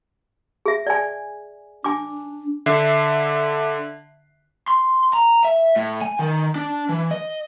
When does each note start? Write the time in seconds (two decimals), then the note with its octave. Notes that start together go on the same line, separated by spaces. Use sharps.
0.66 G#4 E5
0.87 D5 G#5
1.84 D4 G#5 D6
2.66 D3 E5 C7
4.68 C6
5.13 A#5
5.44 E5
5.76 A2
6.02 G#5
6.19 D#3
6.56 D4
6.89 E3
7.11 D#5